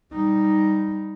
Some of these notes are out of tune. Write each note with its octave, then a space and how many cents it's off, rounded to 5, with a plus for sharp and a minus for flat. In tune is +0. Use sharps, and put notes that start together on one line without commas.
G3 +0 D#4 +0